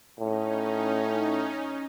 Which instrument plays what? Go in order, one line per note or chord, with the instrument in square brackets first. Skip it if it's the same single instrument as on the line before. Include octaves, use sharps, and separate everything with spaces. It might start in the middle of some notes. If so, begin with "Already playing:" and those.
[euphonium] A2 [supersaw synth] C#4 D#4